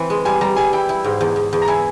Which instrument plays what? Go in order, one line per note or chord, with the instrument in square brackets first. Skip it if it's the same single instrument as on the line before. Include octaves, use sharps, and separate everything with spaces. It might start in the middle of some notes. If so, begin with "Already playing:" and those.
Already playing: [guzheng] E3 C4
G#3
[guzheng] G3 [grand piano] G#5
[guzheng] G3 [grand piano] A#5
[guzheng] G3 [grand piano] G#5
[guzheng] E4 [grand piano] G5
[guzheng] E4
G#2
E2
E2
E2
[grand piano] A#5
[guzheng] E4 [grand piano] G#5